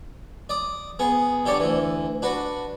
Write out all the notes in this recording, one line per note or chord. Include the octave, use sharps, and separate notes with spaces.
D5 D#6
B3 G#4
D3 G4 C#5 D5
D2 E3
D4 F#4 B4